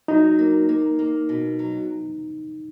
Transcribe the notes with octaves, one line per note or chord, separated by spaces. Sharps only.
F#3 D#4
A#3
A#3
A#3
B2
F#3